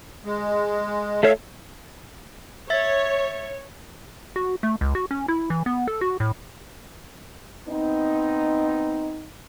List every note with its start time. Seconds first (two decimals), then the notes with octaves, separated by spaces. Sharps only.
0.25 G#3
1.23 A3 A4 C#5 E5 F5
2.70 C#5 E5 A6
4.36 F#4
4.63 A3
4.81 C#2
4.95 F#4
5.11 C#4
5.28 E4
5.50 E3
5.66 B3
5.88 A4
6.01 F#4
6.20 A2
7.68 B3 C4 D#4